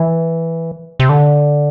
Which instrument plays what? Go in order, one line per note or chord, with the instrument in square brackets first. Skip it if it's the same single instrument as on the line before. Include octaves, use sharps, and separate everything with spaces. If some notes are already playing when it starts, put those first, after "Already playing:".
Already playing: [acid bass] E3
C3
D3